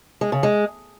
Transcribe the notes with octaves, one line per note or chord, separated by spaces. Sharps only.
G#3
C#3
G#3